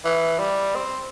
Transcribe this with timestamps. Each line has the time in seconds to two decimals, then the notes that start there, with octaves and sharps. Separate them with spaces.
0.05 E3
0.39 G3
0.75 C4